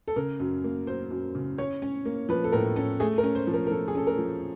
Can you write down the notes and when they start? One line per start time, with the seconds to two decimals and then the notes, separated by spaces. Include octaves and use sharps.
0.08 A4
0.16 C#3 A#4
0.40 F#2
0.64 A#3
0.87 F#3 C5
1.10 F#2
1.35 C#3
1.58 C#4 C#5
1.82 C#4
2.05 A#3
2.29 F3 B4
2.44 A4
2.52 A2 A#4
2.76 C#4 A4
3.00 A3 G#4
3.18 A#4
3.23 C#4
3.35 C5
3.47 F3
3.54 A#4
3.67 A#4
3.71 F3 A4
3.88 G#4
3.95 C#4 A4
4.07 A#4
4.18 F3